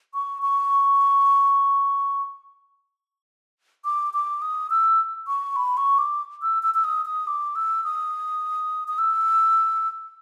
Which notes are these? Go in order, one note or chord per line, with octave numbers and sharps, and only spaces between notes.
C#6
C#6
D6
D6
D#6
E6
C#6
B5
C#6
D6
E6
E6
E6
D#6
D#6
D6
E6
D#6
D#6
E6